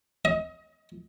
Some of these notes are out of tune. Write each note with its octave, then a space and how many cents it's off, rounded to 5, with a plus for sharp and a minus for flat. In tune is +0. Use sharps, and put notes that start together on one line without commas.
D#5 +30